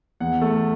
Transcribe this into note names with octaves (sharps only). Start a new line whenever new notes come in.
E2 F#5
A3